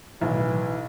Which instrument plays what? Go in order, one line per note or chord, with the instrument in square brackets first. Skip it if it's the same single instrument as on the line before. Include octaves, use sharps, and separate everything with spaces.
[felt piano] B1 [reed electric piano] A2 D#3 F#3 [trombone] E3